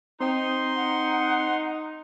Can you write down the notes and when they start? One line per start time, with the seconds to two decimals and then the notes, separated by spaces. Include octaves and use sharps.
0.21 C4 D#4 C5 G5 C6
0.76 F#5